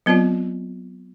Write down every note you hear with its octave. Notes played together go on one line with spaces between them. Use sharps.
F#3 B3 C4 F4 D5